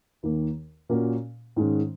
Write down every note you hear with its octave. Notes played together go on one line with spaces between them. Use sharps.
D#2 D#3 A#3
A#2 A#3 C#4 F#4 A#4
G#2 D#3 G#3 C#4